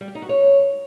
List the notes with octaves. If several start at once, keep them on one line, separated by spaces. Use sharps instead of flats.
G3
G4
D#4
F#4
C#5